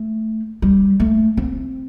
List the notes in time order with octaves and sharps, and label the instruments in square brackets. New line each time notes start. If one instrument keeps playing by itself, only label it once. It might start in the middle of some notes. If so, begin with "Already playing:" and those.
Already playing: [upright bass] A3
G3
A3
C4